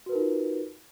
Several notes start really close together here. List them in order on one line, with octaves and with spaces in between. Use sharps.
F#4 B4 A#4 D#4 F4